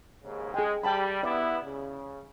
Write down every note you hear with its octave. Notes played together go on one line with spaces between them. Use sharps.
D#2 G#2 C#3
G#3 G#4 G5
G3 G5 A5 B5
B3 E4 D5
C#3